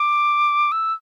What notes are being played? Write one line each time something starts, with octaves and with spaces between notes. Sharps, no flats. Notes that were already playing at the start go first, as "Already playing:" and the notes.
Already playing: D6
E6